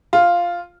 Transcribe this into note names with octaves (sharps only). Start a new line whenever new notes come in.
F4